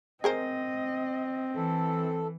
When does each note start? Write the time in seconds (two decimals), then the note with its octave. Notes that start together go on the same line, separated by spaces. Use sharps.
0.24 C4 G#4 A#4 C5 D#5
1.55 E3 A4